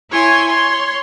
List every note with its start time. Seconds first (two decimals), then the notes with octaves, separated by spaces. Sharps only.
0.11 E4 C#5 G#5 C6
0.46 C#5 C6